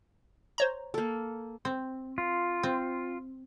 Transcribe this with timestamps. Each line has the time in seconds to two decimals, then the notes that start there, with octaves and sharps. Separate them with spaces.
0.58 C5 C#5 A#5
0.94 A#3 A4
1.65 C4
2.18 F4
2.63 C4